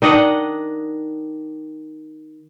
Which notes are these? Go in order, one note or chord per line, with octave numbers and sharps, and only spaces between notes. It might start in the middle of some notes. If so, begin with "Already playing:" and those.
D#3 D4 D#5 F#5